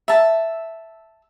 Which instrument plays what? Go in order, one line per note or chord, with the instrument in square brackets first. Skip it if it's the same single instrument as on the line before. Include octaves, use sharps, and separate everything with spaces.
[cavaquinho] E5 A5